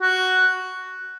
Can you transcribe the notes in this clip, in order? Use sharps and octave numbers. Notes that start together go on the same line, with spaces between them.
F#4